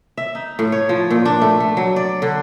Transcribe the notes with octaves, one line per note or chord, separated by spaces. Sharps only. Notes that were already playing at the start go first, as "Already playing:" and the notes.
E5
D#4
A2
C#5
F3
A#2
D4
A3
A3
F#3
D5
D3